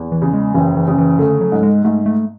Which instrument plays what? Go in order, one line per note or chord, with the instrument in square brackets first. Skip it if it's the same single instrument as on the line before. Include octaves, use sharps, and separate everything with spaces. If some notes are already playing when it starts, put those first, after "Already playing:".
Already playing: [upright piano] E2
[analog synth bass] E3
[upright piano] C#3
[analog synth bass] G#3
[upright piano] F#1 [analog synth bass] E3
[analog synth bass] E3
[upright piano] C#3
[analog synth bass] E3
[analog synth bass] D3 [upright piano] A3
[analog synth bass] F#3
[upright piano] G#2
[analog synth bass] G#3
[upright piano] G#2 [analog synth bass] A3
[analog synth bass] A3